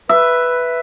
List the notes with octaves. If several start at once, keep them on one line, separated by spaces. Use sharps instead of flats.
B4 E5